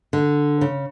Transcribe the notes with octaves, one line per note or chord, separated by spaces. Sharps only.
D3
C#3